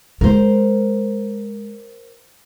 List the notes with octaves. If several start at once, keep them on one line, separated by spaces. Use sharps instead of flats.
G#3 A#4 C5